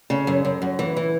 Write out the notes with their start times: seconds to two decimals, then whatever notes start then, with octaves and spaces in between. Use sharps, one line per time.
0.10 C#3
0.27 F#2
0.45 F#2
0.62 F#2
0.79 E3
0.97 E3